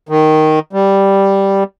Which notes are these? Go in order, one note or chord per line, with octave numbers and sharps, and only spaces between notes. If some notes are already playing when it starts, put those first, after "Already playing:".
D#3
G3